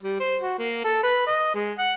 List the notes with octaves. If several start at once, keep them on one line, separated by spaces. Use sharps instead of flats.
G3
C5
F#4
A#3
A4
B4
D#5
G#3
F#5